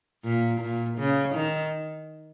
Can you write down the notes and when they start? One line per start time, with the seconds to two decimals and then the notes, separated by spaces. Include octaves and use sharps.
0.25 A#2
0.61 A#2
0.99 C#3
1.35 D#3